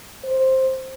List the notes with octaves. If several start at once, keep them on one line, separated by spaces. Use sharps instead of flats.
C5